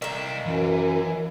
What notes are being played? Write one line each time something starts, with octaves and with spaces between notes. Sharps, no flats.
C2 D#3 A#3 E5
F#2 E3